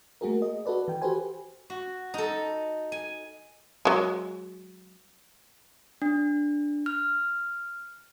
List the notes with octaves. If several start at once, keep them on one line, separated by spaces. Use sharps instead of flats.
A3 A#3 F#4 G#4 A#4
D#5
F#4 A4 B4 D5
E3 G5
F#4 G4 A4 B4 C5 G#5
F#4
D#4 A4
G#5
F#3 G#3
D4
F6